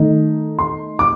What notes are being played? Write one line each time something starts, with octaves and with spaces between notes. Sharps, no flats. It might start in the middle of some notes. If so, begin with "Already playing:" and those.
Already playing: D#3 A3 D#4
C6
D6